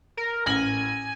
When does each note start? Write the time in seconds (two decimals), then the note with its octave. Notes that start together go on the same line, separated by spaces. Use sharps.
0.17 A#4
0.46 A1 G#5 A#6 F#7